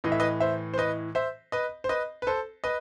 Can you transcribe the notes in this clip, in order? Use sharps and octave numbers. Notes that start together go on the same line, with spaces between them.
A2 E3 D#5
E5
B4 D#5
C5 E5
C5
B4 D#5
C5 E5
B4 D#5
C5
B4 D#5
B4
A4 C5
B4 D#5